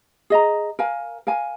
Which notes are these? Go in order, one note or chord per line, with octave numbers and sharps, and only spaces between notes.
G#4 D#5 A#5
A#4 F5 G#5
A#4 F5 G#5